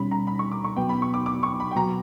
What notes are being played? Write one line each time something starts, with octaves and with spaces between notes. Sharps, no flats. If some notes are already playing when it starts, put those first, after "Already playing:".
Already playing: B2 G3 C#4 B5
A#5
B5
C#6
D6
C#6
B2 F#3 B3 G5
B5
C#6
D6
D6
C#6
B5
G5
B2 F#3 B3 F#4 A#5